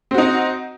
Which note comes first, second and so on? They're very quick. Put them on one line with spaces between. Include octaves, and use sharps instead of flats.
C4 F#4 D#4